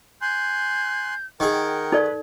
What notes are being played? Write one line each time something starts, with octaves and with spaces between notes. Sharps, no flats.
G#5 C6 F#6 G6
D#3 G#4 A#4 F#5 G5
D#4 A4 B4 D5